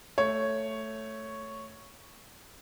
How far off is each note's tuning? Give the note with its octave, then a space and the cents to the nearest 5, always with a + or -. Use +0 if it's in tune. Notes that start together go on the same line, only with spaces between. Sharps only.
A3 +5 C#5 +0